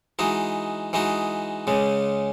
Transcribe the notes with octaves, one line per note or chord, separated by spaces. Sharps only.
E3 G#3 D#4 F#4
E3 G#3 D#4 F#4
C#2 C#3 G#3